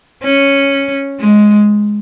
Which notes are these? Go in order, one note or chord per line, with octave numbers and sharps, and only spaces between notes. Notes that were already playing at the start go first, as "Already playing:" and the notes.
C#4
G#3